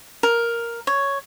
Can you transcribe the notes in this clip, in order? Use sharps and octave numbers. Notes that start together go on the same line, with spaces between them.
A#4
C#5